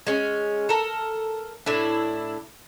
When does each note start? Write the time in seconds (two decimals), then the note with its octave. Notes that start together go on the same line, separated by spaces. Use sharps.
0.07 G#3 C#4
0.69 A4 A#4
1.66 A2 D4 E4